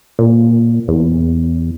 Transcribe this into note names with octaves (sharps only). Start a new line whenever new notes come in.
A#2
E2